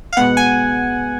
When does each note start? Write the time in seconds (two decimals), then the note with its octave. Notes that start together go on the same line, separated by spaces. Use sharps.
0.13 F5
0.17 B2 G#3 B3 F#5
0.37 G#5